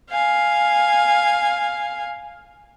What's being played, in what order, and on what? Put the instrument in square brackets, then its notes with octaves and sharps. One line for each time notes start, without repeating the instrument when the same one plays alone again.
[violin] F5 G#5